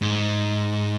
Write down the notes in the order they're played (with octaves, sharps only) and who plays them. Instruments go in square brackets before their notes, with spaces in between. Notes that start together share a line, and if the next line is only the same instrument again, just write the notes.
[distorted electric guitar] G#2